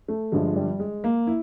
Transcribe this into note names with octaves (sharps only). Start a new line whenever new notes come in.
A3
G1 G2 D3 F3 G#3
G3
G#3
A#3
E4